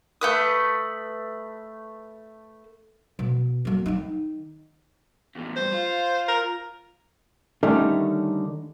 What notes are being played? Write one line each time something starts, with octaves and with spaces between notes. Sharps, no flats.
A3 B4 D#6
B2
F#3 A#3
D#3 D#4
E2 A2
G2 C5
F4
A#4
D3 D#3 G3 A3 C#4 D#4